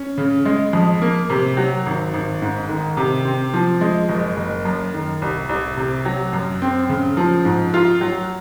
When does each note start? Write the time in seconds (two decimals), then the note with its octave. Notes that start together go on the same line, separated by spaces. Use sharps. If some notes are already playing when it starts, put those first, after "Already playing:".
Already playing: C#4
0.18 C#3
0.45 G#3
0.73 F2
1.02 A#3
1.30 C3
1.57 F#3
1.86 G#1
2.13 G#1
2.42 G#2
2.69 D#3
2.97 C3
3.25 C4
3.54 F3
3.81 G#3
4.09 F#1
4.37 F#1
4.65 F#2
4.94 D#3
5.22 C2
5.49 C2
5.77 C3
6.05 F#3
6.33 F#2
6.62 C4
6.89 C#3
7.17 F3
7.45 G#2
7.74 F4
8.01 F#3